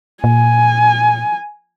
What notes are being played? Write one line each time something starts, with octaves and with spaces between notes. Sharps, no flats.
A#2 G#5